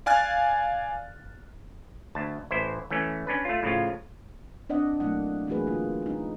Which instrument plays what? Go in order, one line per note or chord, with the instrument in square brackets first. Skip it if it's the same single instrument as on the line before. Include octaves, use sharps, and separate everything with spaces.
[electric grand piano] D5 F5 G#5 F6 F#6 A6
[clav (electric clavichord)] D2 A5
A1 E4 C5
E3 A3 C#4
C#4 D4 B4
A3 F4
A2 C#3 F3 F4
[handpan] C4 D4 D5 D#5 F#5
B2 F#3 A3 A#3 E4 F#5
E3 A3 A#3 F#4 G#4 B4
D3 A#3 F4
G#3 D#4